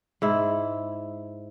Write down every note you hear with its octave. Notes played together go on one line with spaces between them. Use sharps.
G#2 E4